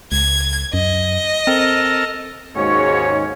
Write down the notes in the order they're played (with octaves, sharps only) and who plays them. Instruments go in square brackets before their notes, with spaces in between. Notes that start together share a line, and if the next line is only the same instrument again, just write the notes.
[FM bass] C#2 [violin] G#6
[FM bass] F#2 [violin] D#5
[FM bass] C4 [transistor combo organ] A4 A#4
[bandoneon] D#2 C#4 [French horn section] G#2 [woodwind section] F#4 C#5